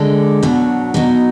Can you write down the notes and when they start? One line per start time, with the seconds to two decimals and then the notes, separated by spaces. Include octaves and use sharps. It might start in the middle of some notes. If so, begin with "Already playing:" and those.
Already playing: D3 G#3 D4
0.43 B2 F#3
0.94 B2 F#3 D#4